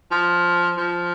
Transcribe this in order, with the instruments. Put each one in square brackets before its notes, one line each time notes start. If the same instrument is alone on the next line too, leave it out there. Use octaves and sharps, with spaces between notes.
[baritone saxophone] F3
F3